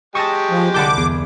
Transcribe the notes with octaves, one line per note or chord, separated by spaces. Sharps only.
G#3 G4 G5 A5 C#6 D#6 E6 A#6
F3
C2 D3 F#5 A5 B5 D6 G6
E2 G#4